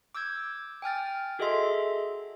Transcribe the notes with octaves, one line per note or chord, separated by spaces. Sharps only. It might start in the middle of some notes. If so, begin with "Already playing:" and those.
D6 E6 G6 G#6
G5 G#5 F6 A6
F#4 G#4 A4 D#5 E5 C6